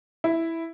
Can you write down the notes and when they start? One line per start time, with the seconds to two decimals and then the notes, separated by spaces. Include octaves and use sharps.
0.24 E4